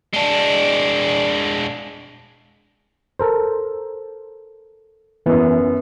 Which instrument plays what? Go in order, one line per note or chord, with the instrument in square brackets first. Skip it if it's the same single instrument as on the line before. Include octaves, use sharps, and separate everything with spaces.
[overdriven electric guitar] G#3 D4
[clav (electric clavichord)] A4 A#4 C5
[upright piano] F#2 B3 [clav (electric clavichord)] E3